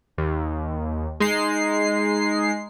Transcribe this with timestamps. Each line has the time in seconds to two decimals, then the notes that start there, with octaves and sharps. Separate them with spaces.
0.18 D#2
1.20 G#3 D#4 C7